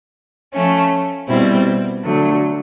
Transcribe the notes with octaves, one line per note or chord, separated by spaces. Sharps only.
F3 A3 C#4
B2 G3 C4 E4
D3 F#3 A3